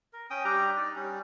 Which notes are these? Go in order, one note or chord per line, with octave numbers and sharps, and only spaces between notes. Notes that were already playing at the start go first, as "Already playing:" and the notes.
A#4
C#4 G5 D#6
G3 D4 G4 A#5
D#4 D5
G3 C#4